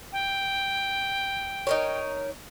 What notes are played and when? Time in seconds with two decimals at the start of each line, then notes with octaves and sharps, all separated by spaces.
0.12 G5
1.67 D#4 A#4 C#5